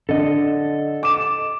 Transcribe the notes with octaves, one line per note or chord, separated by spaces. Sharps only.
D3 A4 D#5
D6 E7